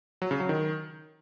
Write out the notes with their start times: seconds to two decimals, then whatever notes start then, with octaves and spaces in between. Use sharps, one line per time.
0.22 F#3
0.31 C#3
0.40 F#3
0.49 D#3